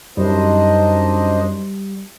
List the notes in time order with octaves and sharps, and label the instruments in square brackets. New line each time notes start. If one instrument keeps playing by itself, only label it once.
[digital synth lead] F#2 [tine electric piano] G3 [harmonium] D4 C5 D#5 [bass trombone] D#4